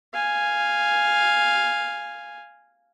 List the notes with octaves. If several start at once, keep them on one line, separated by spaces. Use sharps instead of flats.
F5 G#5